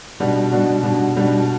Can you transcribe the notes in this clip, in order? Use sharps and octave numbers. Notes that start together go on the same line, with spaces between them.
B2 G3 D4 F#4
B2 G3 D4 F#4
B2 G3 D4 F#4
B2 G3 D4 F#4